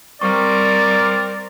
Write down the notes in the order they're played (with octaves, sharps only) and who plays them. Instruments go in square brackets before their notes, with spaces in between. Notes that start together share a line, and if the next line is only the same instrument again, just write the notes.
[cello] G3 [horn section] C4 A#4 [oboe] D5 [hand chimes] C#6